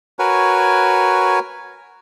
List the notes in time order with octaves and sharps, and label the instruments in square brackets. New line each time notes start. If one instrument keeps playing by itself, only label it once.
[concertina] F#4 A#4 B4 C#5 G#5